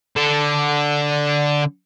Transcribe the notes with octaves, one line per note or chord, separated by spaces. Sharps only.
D3 A4